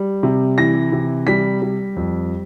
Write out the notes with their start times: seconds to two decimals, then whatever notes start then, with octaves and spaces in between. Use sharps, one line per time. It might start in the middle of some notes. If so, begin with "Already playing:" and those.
Already playing: G3
0.23 C3
0.58 E3 A#6
0.92 C3
1.27 G3 B6
1.62 G3
1.97 F2